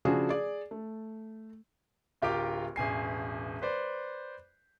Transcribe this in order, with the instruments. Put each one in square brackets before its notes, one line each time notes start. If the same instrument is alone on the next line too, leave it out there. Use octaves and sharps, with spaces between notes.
[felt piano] C#3 F3 D4 F#4 G#4
G#4 D5
A3
[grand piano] D1 F4 G4 A#4 D6
E1 A1 G#5 C7
B4 C5 D5